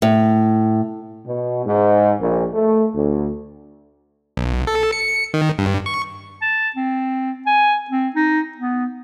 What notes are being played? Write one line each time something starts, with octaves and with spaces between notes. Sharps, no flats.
A2
B2
G#2
A#1
A3
D2
B1
A4
C#7
D#3
G2
C#6
A5
C4
G#5
C4
D#4
B3